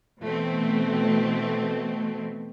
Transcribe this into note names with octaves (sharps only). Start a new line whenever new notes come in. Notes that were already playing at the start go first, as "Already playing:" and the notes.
B2 E3 A3 C4